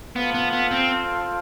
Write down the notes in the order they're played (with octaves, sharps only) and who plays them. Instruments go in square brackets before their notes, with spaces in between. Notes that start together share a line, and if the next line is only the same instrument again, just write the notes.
[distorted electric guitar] B3 [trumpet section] F4 A4 C5 F5
[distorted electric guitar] B3
B3
C4